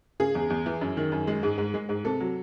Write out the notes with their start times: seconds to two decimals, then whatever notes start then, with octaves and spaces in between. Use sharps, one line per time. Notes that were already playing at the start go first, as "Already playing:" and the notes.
0.20 C#3 G#4
0.35 E2
0.50 E2
0.66 E3
0.81 F#2
0.97 D#3
1.12 F#2
1.27 G#3
1.43 G#2
1.58 G#2
1.74 G#3
1.89 G#2
2.05 C3 A4
2.20 F#3